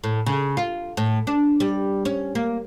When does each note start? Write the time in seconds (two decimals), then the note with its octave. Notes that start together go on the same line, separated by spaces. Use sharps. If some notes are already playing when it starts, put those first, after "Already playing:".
0.04 A2
0.26 C#3
0.57 F4
0.97 A2
1.27 D4
1.60 G3
2.05 C#4
2.35 A#3